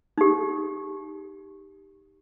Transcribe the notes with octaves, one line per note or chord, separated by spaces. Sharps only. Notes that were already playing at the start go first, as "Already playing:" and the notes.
D#4 G4